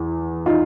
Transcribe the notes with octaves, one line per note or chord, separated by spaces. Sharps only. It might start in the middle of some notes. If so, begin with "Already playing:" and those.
Already playing: E2
D#4 F4